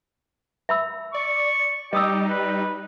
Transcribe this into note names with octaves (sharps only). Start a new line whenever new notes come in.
E5 B5 E6
D5 C#6
G3 D#4 G4 D#5 D#6 E6
B4